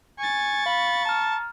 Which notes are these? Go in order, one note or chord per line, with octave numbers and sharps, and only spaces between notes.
G#5 C#6 A6
F5 B5
A5 A#5 F6